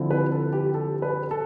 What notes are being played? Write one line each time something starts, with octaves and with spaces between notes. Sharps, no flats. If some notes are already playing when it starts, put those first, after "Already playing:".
Already playing: D3 F3 C4 E4
B4
A4
G4
A4
B4
A4